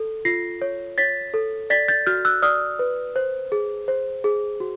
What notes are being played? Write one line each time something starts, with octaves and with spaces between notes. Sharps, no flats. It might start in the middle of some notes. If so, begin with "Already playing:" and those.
Already playing: A4
F4 A#6 C7
C#5
C#5 A6 B6
A4
D5 A6 B6
G6 A6
F#4 F6 G6
E6 F#6
D5 D#6 F6
B4
C5
G#4
C5
G#4
F#4